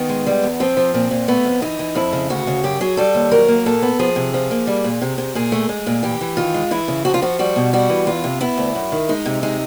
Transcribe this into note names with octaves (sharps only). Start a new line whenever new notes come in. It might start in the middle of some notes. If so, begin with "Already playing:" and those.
Already playing: D#3 B3
G#3
G3
E2
F3 C4
F3
A#2 C4
A#2
A3 B3
F2
E3 D#4
E3
F2 E4
C#3
D2 F#4
C#3
F#2 G4
F#3 G#4
G3 A4
D#2
F#3 A#4
A#3
A#2 A4
B3
F3 G#4
C3
F3
A#3
G3
A#2
C3
C3
A#2 G#4
A3
G#3
A#2
E3 G4
E3
D#3 F4
G#3
E3 E4
C#3
F3 F#4
F4
F3 F#4
G3 F#4
B2
G3 F#4
E3
E2 F4
C3
B3 E4
D2
F#2
D#3
G#3 D#4
C3
G#3 D#4